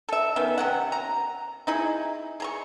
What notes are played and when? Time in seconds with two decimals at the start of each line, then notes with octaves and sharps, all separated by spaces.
0.09 A4 E5
0.36 D#3 B3 C#4
0.58 C3 C#4 F#5
0.92 A#5
1.67 D#4 E4 G#4
2.40 G#4 A#5 C#6